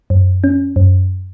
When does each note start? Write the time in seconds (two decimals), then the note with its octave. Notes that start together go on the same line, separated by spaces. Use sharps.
0.10 F#2
0.44 C#4
0.76 F#2